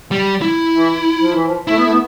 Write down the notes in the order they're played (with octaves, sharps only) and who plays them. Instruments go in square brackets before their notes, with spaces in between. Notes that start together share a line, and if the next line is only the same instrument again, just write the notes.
[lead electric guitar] G3
E4
[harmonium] E3
F3
E3
F3
[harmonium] A3 [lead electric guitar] E4
[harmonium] B3
A3
B3